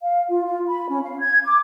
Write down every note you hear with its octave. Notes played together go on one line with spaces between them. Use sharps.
F5
F4
F4
B5
C#4
F5
G#6
D6